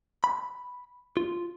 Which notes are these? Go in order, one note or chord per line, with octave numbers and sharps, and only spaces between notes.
B5
F4